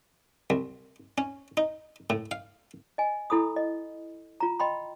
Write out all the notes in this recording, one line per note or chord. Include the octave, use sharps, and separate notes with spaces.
C2
C#4
D#4
A2
F5
D#5 G#5
E4 A4 B5 D#6
D#5
F4 A#5
D#5 G5 B5 C6